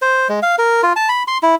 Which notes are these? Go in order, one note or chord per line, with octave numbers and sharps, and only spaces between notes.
C5
G#3
F5
A#4
F4
A5
B5
C6
E4